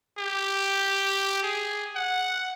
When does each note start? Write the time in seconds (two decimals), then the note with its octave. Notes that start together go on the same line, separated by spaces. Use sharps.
0.19 G4
1.43 G#4
1.96 F#5